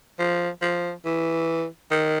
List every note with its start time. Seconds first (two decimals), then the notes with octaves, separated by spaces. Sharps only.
0.19 F3
0.62 F3
1.06 E3
1.91 D#3